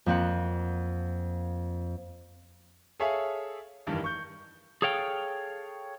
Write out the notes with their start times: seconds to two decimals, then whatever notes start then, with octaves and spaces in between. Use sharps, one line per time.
0.06 F2 A#3 C4 F#5
3.00 G#4 A4 C#5 E5 F5 G#5
3.87 F1 G2 D#3 E3
4.04 C#6 G6
4.82 G#4 A4 C#5 F5 G5